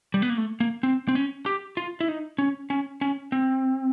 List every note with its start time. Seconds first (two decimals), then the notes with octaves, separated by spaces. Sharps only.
0.14 G3
0.22 B3
0.30 A#3
0.37 A3
0.60 A#3
0.83 C4
1.08 C4
1.15 C#4
1.46 G4
1.77 F4
2.00 E4
2.08 D#4
2.38 C#4
2.70 C#4
3.01 C#4
3.32 C4